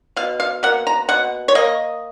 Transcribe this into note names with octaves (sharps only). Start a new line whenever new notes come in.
B2 F5
F5
A#3 F#5
A#5
B2 F#5
C#5
A#3 D#5